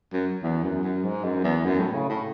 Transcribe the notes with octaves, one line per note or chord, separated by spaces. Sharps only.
F#2
E2
F#2
F#2
G#2
F#2
E2
F#2
A2
C#3
A2